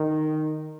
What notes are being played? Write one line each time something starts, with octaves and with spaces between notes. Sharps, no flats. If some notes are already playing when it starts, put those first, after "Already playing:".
Already playing: D#3